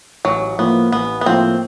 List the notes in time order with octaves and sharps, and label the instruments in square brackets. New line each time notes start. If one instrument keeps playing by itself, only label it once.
[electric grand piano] A1 [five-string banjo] F#3
[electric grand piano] A2 F3 A#3 [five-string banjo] B3
[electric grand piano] A1 [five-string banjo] B3
[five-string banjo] B3
[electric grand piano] A2 F3 A#3 [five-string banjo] C4